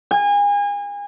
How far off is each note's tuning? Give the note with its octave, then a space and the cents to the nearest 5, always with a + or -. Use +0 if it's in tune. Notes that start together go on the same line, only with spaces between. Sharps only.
G#5 -35